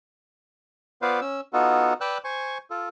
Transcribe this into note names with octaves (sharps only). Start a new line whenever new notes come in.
B3 F4 B4 C5 D5 F5
C#4 E6
B3 D#4 F4 F#4 A4
B4 D5 G5 E6 F#6
C5 G#5 C#6
F4 A4